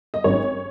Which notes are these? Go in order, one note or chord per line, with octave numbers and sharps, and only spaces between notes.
D#5
G#1 G#2 F#3 C#4 C#5